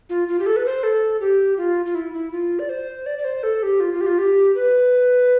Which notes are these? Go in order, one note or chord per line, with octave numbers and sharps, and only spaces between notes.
F4
F4
G4
A4
B4
C5
A4
G4
F4
F4
E4
E4
F4
D5
C5
D5
D5
C5
A4
G4
F4
F4
G4
F4
G4
B4